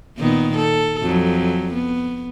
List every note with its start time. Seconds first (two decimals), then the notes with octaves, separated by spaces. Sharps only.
0.18 A#2 D#3 B3
0.57 A4
1.02 F2 F#3
1.74 B3